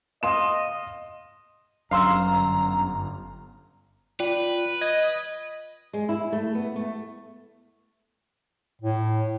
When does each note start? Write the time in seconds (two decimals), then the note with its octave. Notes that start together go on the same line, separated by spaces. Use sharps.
0.23 D#5 F5 C6 E7
1.91 G1 F#2 F5 A#5 C6 E6
4.20 F4 B4 D5 G5
4.81 D#5 G#6
5.93 G#3
6.09 E4
6.32 A3
6.55 B3
6.76 A3
8.81 A2